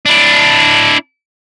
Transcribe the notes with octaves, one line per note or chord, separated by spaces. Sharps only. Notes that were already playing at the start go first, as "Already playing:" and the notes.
D4 E4